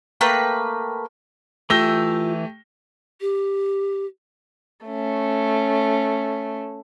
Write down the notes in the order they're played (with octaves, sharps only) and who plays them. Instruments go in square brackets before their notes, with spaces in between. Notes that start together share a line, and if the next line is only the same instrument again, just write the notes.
[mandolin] A3 A#3 B4 G5
[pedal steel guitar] E3 E6 G6 [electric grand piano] A3 [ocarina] F4 [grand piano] G4 A#6 G7
[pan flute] G4
[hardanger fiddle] A3 C#4